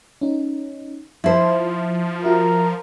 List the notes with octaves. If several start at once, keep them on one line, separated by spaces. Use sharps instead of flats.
C#4 D#4
F3 E4 C5 E5 A5 C6
F4 F#4 A#4 E5